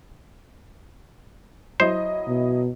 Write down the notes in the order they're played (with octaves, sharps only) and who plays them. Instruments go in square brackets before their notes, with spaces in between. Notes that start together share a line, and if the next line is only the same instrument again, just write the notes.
[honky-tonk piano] F#3 E4 D#5 [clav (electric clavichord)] C5
[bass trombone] B2